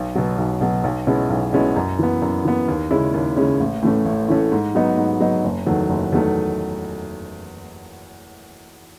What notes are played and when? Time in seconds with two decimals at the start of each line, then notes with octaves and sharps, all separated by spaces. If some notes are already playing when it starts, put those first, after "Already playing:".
Already playing: B1
0.15 B2 F#3
0.38 B1
0.61 B2 F#3
0.84 B1
1.07 B2 G#3 C#4 E4
1.30 B1
1.53 B2 G#3 C#4 E4
1.76 F#2
1.99 E3 B3
2.22 F#2
2.45 E3 B3
2.68 D#2
2.91 C#3 G#3 C#4 E4
3.14 D#2
3.36 C#3 G#3 C#4 E4
3.60 A1
3.82 A2 E3 A3 C#4
4.05 A1
4.28 A2 E3 A3 C#4
4.52 G#2
4.75 F#3 B3 D#4
4.97 G#2
5.20 F#3 B3 D#4
5.44 F#1
5.66 E2 D#3 F#3 A3
5.89 F#1
6.12 E2 D#3 F#3 A3